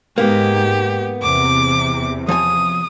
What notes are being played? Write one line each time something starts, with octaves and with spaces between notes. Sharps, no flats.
G#2 A#3 B3 G4
E2 C3 D6
F3 C#5 G#5 D#6